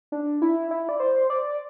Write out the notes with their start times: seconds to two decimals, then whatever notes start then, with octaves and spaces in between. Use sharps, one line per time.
0.12 D4
0.42 E4
0.71 E4
0.89 D5
1.00 C5
1.30 D5